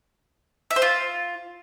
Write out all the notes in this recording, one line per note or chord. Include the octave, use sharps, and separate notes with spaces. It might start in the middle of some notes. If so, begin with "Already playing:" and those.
E5
C5
F4